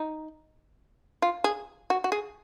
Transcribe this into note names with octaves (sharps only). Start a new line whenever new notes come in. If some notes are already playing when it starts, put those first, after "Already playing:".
Already playing: D#4
F4
G#4
F#4
F#4
G#4